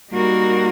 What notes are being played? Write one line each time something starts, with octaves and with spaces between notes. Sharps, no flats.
G3 A#3 D#4 F#4 A#4